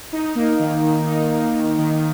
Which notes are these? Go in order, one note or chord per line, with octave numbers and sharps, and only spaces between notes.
D#4
A#3
D#3
D#3
D#4
A#3
D#3
D#3